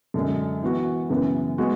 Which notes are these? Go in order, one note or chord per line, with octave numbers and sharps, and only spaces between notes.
F#2 D3 G#3
E3 B3 F#4
F#2 C#3 E3 B3
B2 G#3 B3 F#4